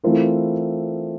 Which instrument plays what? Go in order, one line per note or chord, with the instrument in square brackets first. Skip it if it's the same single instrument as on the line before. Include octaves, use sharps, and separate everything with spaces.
[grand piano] E3 A3 C4 F4 A#4